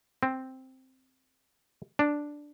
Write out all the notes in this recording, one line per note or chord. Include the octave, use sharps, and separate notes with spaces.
C4
D4